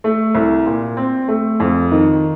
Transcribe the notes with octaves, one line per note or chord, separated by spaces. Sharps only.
A3
C2
A#2
C4
A3
F2
D#3